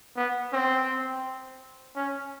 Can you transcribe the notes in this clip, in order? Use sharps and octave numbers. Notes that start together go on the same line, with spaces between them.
B3
C4
C#4